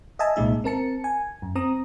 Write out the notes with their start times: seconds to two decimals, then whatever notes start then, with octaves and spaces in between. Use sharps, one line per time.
0.19 D#5 E5 G#5 A5
0.36 C2 A#2 G#3 D#4 E5
0.64 C4 A#4 A5 C#7
1.04 G#5
1.42 F#2
1.55 C4 A#5 D#6